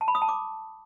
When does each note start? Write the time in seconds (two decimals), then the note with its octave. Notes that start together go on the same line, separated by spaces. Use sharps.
0.01 A5
0.08 B5
0.15 D#6
0.22 A5
0.29 D6